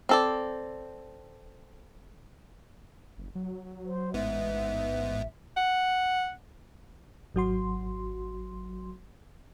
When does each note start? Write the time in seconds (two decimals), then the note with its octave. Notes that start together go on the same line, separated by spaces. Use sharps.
0.09 C4 A4 D5
3.18 F#1
3.35 F#3
3.85 C5
4.14 A1 G#2 B3 E5
5.57 F#5
7.35 G#1 F#3 F#4 C6